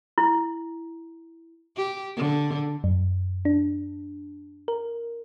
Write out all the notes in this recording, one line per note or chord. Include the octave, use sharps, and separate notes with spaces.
E4
G4
D3
F#2
D4
A#4